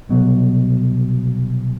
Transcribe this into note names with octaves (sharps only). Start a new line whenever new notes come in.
C2 B2 F#3